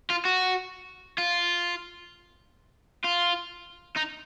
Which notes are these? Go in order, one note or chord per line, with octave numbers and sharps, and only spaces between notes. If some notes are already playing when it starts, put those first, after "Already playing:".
F4
F#4
F4
F4
D#4